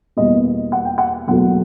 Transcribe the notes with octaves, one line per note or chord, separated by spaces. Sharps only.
E2 B2 G3 A#3 D#5
F#5
G5
F#5
F#1 E2 B2 F#3 A3 F#5